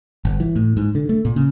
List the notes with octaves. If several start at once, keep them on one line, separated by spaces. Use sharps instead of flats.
G1
E3
A2
G#2
D3
A3
A#2
C#3